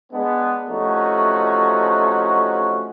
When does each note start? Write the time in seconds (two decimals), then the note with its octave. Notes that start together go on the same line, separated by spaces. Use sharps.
0.13 G#3 B3 D4
0.68 C3 F3 A3 C#4 D#4 F#4